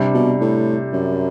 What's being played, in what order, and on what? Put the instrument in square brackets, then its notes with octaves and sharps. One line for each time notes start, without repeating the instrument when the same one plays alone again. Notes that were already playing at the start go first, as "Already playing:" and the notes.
Already playing: [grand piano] C3 G3 D4
[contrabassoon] B2
A2
F#2